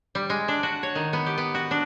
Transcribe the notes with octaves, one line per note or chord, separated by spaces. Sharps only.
G3
G#3
D4
F#4
C#5
D#3
B3
G4
B3
F#4
D4